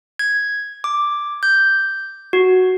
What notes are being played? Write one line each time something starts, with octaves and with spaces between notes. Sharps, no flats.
G#6
D6
G6
F#4